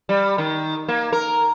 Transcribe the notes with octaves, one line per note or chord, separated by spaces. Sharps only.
G3
D#3
A#3
A#4